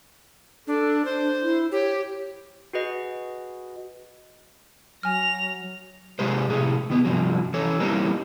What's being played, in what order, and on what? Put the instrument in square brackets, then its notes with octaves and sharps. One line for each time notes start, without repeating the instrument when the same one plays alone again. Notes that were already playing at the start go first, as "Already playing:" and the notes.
[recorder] D4 [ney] A4
[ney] D4 [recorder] C5
[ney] E4
[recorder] G4 [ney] C#5
[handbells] F#4 G#4 B4 D#5
[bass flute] F#3 [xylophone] G#5 F6 [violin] A#6 F7
[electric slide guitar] C3 G#3 G4 B4 C5
A2 C3 G#4
D#3 B3
G2 C3 F3 F#3
E3 A4 C#5
E3 G3 A#3 C4 D#4